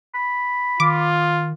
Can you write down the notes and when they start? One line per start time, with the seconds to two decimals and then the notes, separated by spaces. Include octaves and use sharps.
0.15 B5
0.80 D#3 F4 D6